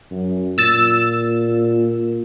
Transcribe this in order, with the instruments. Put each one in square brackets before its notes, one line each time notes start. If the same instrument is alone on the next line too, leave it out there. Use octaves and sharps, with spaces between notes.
[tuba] F#2
[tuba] A#2 [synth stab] E6 A6 E7